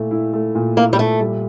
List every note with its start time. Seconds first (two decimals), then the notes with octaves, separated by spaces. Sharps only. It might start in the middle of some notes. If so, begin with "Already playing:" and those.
Already playing: A#2 A3 E4
0.11 E4
0.33 A3
0.55 A#2
0.77 A#3 E4
0.93 G3
0.99 A#2 A3
1.21 G3